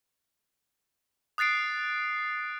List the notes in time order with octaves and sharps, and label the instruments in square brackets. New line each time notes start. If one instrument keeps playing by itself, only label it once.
[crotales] D#6 F#6 A6 C7 D7